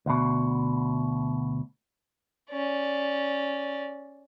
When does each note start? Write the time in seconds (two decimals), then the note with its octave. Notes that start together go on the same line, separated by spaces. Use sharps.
0.06 D2 B2
2.50 C#4 D5